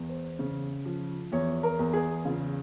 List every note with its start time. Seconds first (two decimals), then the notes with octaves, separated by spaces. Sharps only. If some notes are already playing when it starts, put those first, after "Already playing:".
Already playing: E2
0.09 C5
0.39 C#3
0.85 F3
1.32 E2 C#5
1.63 A#4
1.79 E2
1.93 G#4
2.25 C#3 F4